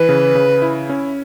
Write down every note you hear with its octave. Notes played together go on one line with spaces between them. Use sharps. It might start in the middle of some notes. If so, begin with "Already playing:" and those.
Already playing: E3 B4
C#3
C#3
E4
C#4